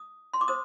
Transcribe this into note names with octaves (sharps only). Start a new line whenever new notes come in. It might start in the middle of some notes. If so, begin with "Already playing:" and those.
Already playing: D#6
C6
D6
C5 D#6